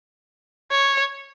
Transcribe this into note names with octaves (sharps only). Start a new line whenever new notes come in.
C#5